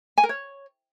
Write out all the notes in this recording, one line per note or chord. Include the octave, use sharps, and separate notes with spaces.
G#5
A#4
C#5